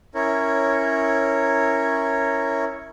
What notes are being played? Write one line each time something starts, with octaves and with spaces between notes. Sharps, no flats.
C#4 E4 A#4 C#5